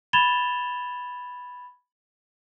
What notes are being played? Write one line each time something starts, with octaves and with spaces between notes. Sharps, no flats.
B5 G#6 A6 E7 F7 G7